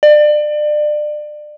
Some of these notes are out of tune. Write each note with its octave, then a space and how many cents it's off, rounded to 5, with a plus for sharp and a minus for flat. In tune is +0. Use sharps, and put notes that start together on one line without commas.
D5 +30